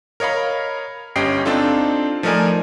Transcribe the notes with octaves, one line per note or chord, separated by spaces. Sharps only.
A#4 C#5 D#5 F5 B5
G1 C#4 G4 D#5 G5 C7
C4 D4 D#4 F4 A4
F3 A3 D#4 A#4 D5 G#5